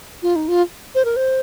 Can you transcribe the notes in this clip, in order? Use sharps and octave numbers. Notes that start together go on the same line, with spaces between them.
F4
D#4
F4
C5
A#4
C5